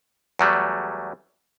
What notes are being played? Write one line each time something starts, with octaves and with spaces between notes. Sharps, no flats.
E2 F#3 G3 A3